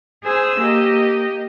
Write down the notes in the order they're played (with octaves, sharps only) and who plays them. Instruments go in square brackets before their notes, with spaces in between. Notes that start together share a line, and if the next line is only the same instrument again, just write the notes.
[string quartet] G#4 C5 G#5 E6
A#3 G4 D#5